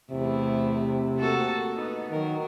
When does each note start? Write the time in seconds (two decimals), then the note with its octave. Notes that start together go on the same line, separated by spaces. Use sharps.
0.11 E2 C3 A3 E4
1.16 A#3 F#4 A4
1.75 B3 D#4
2.11 D#3 F#3 A#4